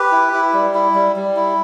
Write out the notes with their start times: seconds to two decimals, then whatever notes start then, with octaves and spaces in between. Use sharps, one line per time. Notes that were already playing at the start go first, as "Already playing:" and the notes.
Already playing: G4 B4
0.12 E4
0.33 E4
0.54 G3
0.74 E4
0.95 G3
1.16 G3
1.36 E4